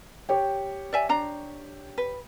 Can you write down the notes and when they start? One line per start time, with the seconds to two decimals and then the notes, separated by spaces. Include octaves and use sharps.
0.29 G4 C#5 G5
0.93 D5 E5 G#5
1.09 D4 A#5
1.98 B4